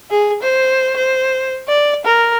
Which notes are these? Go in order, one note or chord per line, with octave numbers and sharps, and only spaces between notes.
G#4
C5
C5
D5
A#4